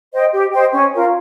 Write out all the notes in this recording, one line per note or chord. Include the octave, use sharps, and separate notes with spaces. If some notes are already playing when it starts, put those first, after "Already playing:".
C5 D#5 G5
G4
C5 D#5 G5
C#4
F4 A#4